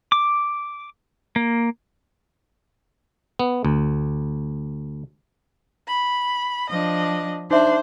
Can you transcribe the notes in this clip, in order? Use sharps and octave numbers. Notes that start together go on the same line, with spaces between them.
D6
A#3
B3
D2
B5
F3 D4 D#5
D4 D#4 C5 E5